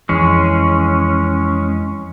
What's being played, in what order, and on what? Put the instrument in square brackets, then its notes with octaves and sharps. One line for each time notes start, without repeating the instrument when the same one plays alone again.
[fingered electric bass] F2 E3 [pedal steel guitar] G#3 C#4